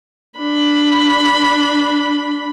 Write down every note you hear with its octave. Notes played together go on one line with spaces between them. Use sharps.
D4 B5